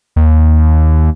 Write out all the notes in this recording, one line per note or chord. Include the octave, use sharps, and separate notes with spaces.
D#2